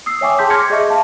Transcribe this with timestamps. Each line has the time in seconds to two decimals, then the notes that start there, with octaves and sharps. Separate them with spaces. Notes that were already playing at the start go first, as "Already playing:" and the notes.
0.06 D#6 E6 C7
0.21 C#5 E5 G5 G#5 C#6 D6
0.39 G#4 A5 C6 G6 B6
0.50 C6 D6 F6 G#6 A#6 C#7
0.70 G#4 D#5 E5 C#6
0.90 E5 F5 A5